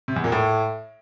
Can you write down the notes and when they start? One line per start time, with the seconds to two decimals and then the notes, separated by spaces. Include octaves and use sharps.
0.08 C3
0.16 E2
0.24 A#2
0.32 A2